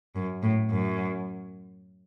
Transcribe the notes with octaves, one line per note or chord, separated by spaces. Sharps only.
F#2
A2
F#2